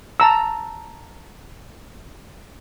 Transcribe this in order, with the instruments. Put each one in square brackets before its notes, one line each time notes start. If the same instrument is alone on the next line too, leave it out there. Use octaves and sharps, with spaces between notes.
[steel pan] A5 A#5 E6